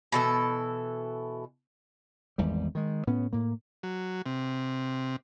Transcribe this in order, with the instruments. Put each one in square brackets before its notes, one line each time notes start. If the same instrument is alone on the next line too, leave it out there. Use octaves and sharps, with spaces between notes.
[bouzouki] B2 E3 A4
[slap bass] G#1 E2 G#2 G3
D#3 G#3
A2 B3 C#4
A2 A#3
[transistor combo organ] F#3
C3